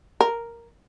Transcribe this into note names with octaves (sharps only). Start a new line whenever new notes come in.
A#4